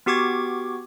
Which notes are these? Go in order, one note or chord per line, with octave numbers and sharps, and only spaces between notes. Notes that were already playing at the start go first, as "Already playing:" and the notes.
B3 F#4 G4 C#6 D6 G#6